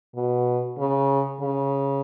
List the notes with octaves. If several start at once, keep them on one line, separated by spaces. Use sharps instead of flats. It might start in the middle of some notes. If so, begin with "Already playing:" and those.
B2
C#3
C#3